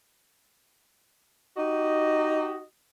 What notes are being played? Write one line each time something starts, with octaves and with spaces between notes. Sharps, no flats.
D#4 F#4 G4 D#5